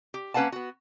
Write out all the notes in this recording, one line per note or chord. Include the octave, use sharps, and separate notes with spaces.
G4
A#3 C#4 B4 F5 F#5 A5
B3 F#4